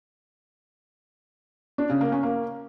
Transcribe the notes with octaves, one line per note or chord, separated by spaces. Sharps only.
D4
C#3
A#3
C#4
A#3